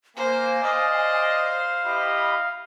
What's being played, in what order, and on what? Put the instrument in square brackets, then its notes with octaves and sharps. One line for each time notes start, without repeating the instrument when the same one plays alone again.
[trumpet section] A#3 [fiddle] C5 [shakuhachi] G#5
[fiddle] C5 [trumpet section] D5 D#5 [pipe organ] F5
[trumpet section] E4 G4 D#5 [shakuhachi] B5